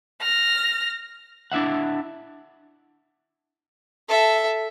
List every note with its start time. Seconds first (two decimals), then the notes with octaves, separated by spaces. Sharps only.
0.21 F6 A#6
1.52 D4 E4 E5 F#5
4.09 A4 E5